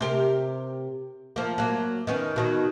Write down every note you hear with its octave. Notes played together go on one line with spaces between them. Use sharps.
C3 G4 A#4
F3 A#3
F#3 A#3
D#3 B3 C#4
B2 D#3 F#3